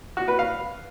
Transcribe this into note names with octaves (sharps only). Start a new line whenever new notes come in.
F#4
B4
F5